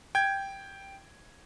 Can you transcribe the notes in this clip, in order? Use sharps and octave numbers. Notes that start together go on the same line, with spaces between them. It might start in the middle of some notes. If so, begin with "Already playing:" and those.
G5 G#6